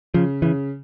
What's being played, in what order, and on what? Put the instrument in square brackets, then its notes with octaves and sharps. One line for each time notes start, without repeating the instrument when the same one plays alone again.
[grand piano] C#3 [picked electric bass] F3
[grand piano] C#3 [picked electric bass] E3